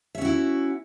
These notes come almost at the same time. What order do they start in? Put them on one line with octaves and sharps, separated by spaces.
E5 C#4 F#4 E4